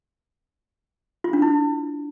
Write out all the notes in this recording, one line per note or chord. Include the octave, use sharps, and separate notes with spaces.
F4
D4
E4